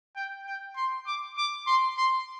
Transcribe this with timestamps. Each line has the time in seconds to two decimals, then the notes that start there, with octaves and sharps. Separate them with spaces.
0.16 G5
0.47 G5
0.76 C6
1.07 D6
1.37 D6
1.67 C6
1.97 C6